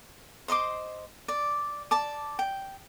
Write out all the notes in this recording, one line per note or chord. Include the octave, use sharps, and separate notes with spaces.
C5 D#5 C6 D6
D5
D5 A5 D6
G5